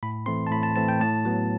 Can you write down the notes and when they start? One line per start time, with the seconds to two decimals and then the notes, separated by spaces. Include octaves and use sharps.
0.03 A2 B5
0.26 E3 A3 C4 C6
0.47 A5
0.51 A2 B5
0.63 A5
0.76 E3 A3 C4 A5
0.89 G5
1.00 A2 A5
1.25 F#3 B3